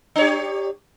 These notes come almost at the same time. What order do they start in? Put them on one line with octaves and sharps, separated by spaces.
D4 C#5 G4